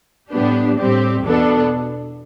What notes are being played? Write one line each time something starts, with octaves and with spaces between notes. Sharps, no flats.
A2 G3 B3 D4 G4
A2 G3 C4 G4
E2 B2 B3 D4 A4